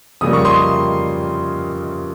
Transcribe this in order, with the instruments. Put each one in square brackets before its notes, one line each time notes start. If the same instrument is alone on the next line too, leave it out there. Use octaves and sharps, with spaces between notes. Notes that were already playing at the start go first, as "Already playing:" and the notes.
[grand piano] F2 C#3 G3 A#3 D#6
C#6
C6 D#6